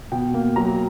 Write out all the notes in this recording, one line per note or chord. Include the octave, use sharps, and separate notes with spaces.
B2 G5
A#3
F#3 A#5